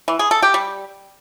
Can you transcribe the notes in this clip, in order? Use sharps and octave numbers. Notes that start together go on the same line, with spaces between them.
E3
G#4
A4
G4
G3